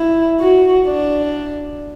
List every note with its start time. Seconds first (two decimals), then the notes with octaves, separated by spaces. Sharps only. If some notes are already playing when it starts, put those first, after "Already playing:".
Already playing: E4
0.40 F#4
0.87 D4